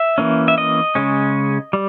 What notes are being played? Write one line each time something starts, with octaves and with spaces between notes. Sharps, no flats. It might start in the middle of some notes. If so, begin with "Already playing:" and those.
Already playing: E5
E3 A#3 C#4
E5
D#5
C#3 G#3 C#4
G3